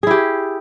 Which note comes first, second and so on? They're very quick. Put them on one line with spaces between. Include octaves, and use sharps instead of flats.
G#4 E4 G4